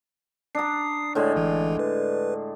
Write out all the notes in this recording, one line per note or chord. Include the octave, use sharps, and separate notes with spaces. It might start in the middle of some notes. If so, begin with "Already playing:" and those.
D4 A#5 D#6 C7
A2 D3 G#3 C#5 D5
G1 E3
B4